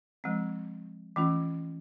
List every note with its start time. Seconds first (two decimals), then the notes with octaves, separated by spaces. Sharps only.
0.24 F3 G#3 C4
1.16 E3 A3 C#4 F4